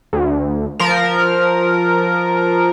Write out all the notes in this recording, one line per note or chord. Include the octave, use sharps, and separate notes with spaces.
D2
F3 A#4